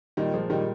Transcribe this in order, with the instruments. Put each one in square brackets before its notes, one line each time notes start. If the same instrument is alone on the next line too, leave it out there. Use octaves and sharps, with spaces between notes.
[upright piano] A#2 [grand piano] D#3 G3
[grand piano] F3 [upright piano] G#3
[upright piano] A#2 [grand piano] D#3 G3